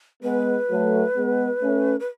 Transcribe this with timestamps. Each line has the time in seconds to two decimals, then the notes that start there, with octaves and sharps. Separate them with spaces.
0.23 G#3 B3 B4
0.70 F#3 A3
1.15 G#3 B3
1.61 A3 C#4
2.00 B4